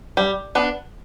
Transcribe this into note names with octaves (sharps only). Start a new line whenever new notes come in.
G3
B3 D4